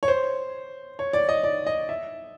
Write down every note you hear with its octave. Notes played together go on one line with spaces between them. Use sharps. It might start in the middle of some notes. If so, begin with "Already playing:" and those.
C#5
C5
C#5
D5
D#5
D5
D#5
E5